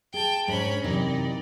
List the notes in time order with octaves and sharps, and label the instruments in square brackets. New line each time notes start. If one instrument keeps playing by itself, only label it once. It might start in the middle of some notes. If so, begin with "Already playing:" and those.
[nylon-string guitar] G#4 [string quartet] G5 A5
[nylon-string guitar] G#2 D4 C5 [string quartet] C#4 B5
[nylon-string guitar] F#2 C3 E3 [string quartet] D#4 D5